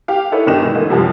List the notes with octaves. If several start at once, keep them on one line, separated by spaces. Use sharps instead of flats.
G4 F5
D#4 E4 A4 B4 C#5 E5
G1 D#3 D4 G4 D#5 E7
B2 E3 G#3 E4
A1 D3 A#3 D#5
F#2 C3 F3 G3